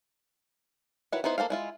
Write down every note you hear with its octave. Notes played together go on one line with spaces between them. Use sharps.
D#3 E4 F#4 B4 C#5
B3 D#4 E4 C5
A#3 A4 C5 F5
G#3 E4 F4